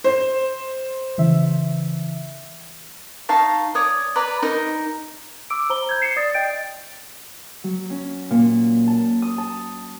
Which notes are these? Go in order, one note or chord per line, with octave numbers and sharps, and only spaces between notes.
C5
C#3 E3 E5
D#4 F5 A5 C#6
C#5 D5 D#6
B4 D5 A#5
D#4 A#4
D6 E6 D7
C5 A#5 B5 G7
G6 G#6
C7 C#7 E7
D5 D#6 A6
D#5 G5 G6 A6 D7
F#3
C#4
A#2
A5
D#6
A5